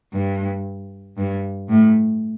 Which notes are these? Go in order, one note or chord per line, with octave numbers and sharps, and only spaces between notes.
G2
G2
A2